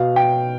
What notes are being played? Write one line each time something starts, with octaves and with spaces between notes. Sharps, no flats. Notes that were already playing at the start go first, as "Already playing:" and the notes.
Already playing: B2 F5
G5